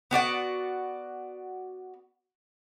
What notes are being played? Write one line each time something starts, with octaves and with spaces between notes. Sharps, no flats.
B3 F#4 D5 F#5